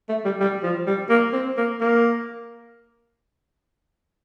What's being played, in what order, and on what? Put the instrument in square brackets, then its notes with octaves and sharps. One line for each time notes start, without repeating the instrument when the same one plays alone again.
[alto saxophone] A3
G3
G3
F3
G3
A#3
C4
A#3
A#3